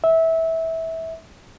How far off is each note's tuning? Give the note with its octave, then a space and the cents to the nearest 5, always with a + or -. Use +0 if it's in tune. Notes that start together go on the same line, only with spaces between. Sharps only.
E5 -20